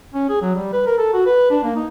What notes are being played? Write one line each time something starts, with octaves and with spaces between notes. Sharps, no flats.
C#4
G#4
F#3
G3
B4
A#4
A4
F#4
B4
D4
A#3
D#4